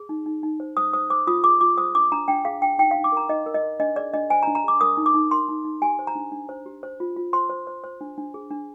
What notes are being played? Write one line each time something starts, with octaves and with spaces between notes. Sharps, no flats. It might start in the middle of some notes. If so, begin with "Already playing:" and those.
Already playing: G#4
D#4
D#4
D#4
C5
C5 D#6
C5 D#6
C5 D6
F4 D#6
G#4 D6
F4 D6
C5 D#6
D4 D6
D4 A#5
D4 G5
G#4 F5
D4 G5
D#4 G5
D#4 F5
D6
A#4 A#5
D#4 D#5
A#4
D#5
A#4
D4 D#5
G#4 D5
D4 D#5
C5 G#5
A#5
D4
A#5
G#4 D6
A#4 D#6
D#4
D6
D#4
A#4 C6
D#4
D#4
G4 G#5
C5
A#5
D4
D4
C5
G4
C5
F4
F4
C5 C6
C5
C5
C5
D4
D4
G#4
D4